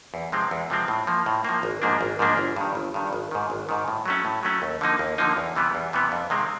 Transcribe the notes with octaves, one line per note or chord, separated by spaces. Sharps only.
E2
C3 F3 G#3 C4
E2
C3 F3 G#3 C4
A2
F3 A#3
A2
F3 A#3
G#1
G#2 F3 A#3 D4
G#1
G#2 F3 A#3 D4
G1
G2 D#3
G1
G2 D#3
G#1
G#2 D#3
G#1
G#2 D#3
A2
F#3 A3 C#4
A2
F#3 A3 C#4
D#2
D3 F3 A#3 D#4
D#2
D3 F3 A#3 D#4
E2
C3 E3 G3 B3
E2
C3 E3 G3 B3
F2
C3 D#3 G#3 C4